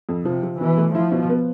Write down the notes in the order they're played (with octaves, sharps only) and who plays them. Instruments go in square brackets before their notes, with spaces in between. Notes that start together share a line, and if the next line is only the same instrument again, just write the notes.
[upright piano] F2
[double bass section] C3 [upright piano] F3
[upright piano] F3
[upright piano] B2 [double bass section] E3
[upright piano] A3
[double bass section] F3 [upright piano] E4
[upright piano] B2
B3